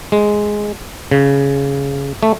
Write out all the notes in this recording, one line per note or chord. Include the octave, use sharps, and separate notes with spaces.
G#3
C#3
A3